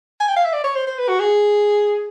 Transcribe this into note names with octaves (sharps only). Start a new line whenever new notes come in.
G#5
G5
F5
E5
D5
C#5
C5
C5
B4
F#4
G#4